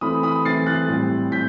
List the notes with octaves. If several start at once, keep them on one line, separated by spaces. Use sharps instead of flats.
E3 A3 C4 B5 D#6
B5 D#6
E3 A3 C4 A6 C7
F#6 A6
A2 G3 C4
A2 G6 B6